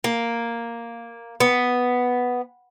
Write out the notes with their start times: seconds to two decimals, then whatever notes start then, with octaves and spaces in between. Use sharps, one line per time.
0.04 A#3
1.40 B3